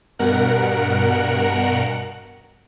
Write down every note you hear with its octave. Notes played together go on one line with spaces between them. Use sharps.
G2 B2 A#4 F#5 F#6